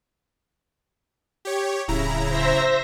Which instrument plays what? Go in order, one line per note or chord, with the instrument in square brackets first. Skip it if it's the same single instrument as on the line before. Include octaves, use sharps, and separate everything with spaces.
[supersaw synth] G4 C#5
[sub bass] D1 [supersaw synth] C#3 E4 A#5
[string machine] C5 E5 A#6